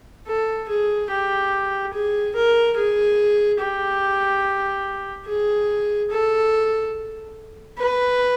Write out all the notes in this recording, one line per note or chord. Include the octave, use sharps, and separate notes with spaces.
A4
G#4
G4
G#4
A#4
G#4
G4
G#4
A4
B4